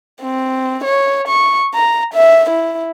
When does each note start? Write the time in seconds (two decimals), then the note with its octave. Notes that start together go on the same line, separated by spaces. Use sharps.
0.22 C4
0.84 C#5
1.28 C#6
1.74 A#5
2.14 E5
2.50 E4